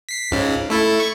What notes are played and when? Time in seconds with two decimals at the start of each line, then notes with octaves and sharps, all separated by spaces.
0.09 B6 C7
0.31 C#2 G#2 C#3
0.70 A3 E4 A4
1.00 C#6